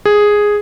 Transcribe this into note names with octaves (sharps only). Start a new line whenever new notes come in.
G#4